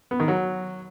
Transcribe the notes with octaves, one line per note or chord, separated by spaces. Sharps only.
B3
D#3
F#3